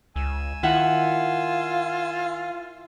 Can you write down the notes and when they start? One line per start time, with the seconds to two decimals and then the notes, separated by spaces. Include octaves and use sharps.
0.16 C#2 G#5 E6
0.63 D#3 E4 F4 E5 F#5